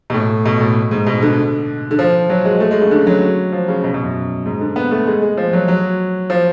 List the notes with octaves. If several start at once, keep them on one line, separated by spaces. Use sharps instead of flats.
B2
A2
B2
A2
G#2
B2
D3
D3
F3
F#3
G#3
A3
G#3
C#3
D3
F#3
F3
C#3
B2
B2
F#2
G#2
D3
B3
A3
G#3
G#3
F3
F#3
F#3
F3